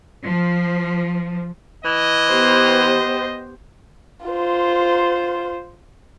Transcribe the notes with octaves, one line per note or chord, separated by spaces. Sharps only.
F3
E3 D#5
B3 G4 C5
F4 C5